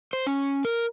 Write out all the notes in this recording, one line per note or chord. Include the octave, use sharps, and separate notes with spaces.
C5
C#4
A#4